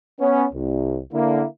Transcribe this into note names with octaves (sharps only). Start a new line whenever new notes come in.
B3 C#4
C2
D3 A#3 E4